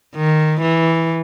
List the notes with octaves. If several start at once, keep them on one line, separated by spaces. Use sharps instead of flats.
D#3
E3